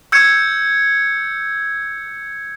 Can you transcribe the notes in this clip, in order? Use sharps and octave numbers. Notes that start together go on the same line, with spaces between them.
E6 G6 G#6 C#7